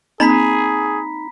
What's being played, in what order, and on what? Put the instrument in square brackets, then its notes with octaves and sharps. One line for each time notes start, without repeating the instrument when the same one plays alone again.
[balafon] A#3 C4 [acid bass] D#4 [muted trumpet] G#4 [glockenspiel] A#5 B5 B6